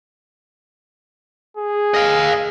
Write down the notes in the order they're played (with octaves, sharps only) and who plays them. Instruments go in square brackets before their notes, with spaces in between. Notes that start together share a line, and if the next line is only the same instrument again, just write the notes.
[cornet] G#4
[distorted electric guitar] D#5 F5